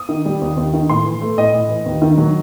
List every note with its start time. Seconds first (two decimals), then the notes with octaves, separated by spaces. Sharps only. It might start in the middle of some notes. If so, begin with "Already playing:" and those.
Already playing: D#6
0.09 D#3
0.25 G3
0.42 D#2
0.57 D#2
0.73 D#3
0.90 A2 C6
1.06 E3
1.22 A3
1.38 A2 D#5
1.54 A2
1.69 E3
1.86 D#2
2.02 D#3
2.18 F#3